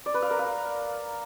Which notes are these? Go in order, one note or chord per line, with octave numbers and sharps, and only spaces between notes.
D5
B4
F5
A#4
F5